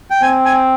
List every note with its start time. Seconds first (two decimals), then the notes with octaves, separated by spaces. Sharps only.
0.10 G5
0.22 C4 G#5
0.45 G#5